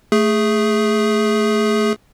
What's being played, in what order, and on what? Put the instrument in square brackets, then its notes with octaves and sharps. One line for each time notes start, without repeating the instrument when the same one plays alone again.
[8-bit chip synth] A3 G#4